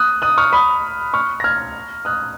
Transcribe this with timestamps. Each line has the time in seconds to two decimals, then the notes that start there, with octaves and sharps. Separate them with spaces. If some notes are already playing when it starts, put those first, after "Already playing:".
Already playing: D#6 F#6
0.22 D#6 F#6
0.38 C#6 F6
0.53 B5 D#6
1.14 C#6 F6
1.40 A#6
1.44 F6 G#6
2.05 D#6 F#6